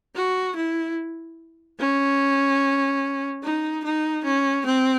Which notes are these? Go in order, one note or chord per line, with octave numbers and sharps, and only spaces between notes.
F#4
E4
C#4
D#4
D#4
C#4
C4